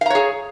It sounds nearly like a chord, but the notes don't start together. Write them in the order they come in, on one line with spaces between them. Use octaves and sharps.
F5 A#5 C#5 G#4